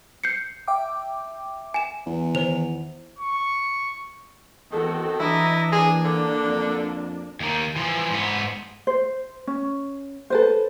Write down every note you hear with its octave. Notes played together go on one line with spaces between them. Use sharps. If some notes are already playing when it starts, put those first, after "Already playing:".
G6 C7 C#7
E5 G5 D6
G#5 E7
E2
D#3 C5 F7
C#6
E2 D#3 C4 F#4 A4
E3 D4 E4 D#5 A#5
A#3 D4 G#4
D3
F2
D#2 D#3
E3 F3
G#2 B3
C5
C#4
A4 B4 C5